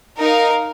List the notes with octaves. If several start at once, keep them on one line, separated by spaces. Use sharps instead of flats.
D#4 A#4 F5